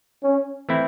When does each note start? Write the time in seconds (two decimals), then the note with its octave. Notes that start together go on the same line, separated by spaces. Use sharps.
0.24 C#4
0.69 E3 A3 C4 E4